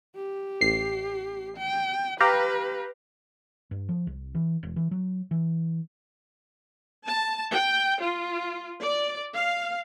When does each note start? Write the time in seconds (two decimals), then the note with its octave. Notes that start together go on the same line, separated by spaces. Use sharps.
0.16 G4
0.61 A1 C7
1.57 G5
2.20 G4 B4 F5 A#5
3.71 G2
3.89 F3
4.07 C2
4.35 E3
4.63 E1
4.76 E3
4.91 F#3
5.31 E3
7.05 A5
7.50 G5
7.99 F4
8.81 D5
9.36 F5